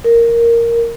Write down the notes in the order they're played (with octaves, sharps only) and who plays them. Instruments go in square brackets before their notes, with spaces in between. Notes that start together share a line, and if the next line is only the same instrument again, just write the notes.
[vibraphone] A#4